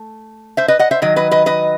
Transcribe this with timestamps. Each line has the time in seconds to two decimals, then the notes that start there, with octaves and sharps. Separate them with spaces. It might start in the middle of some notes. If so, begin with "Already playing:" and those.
Already playing: A3
0.57 C5 E5
0.68 B4 D#5
0.79 D#5 F#5
0.91 C5 E5
1.02 D#3 F#3 D#5
1.16 B4 D#5
1.31 B4 D#5
1.46 B4 D#5